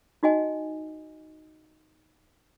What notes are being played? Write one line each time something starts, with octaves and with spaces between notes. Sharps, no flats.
D#4 F#4 D#5 G#5